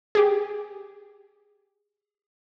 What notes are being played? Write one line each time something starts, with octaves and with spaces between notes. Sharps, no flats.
G4 G#4